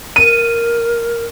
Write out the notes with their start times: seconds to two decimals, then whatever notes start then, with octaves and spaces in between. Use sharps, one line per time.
0.16 A#4 D#7